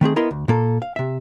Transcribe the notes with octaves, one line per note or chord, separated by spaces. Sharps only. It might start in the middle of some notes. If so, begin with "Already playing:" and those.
D#3 A3 C4 G#4
B3 E4 A#4 D#5 C6
D2
A#2 A#3 A4
F5
C3 E5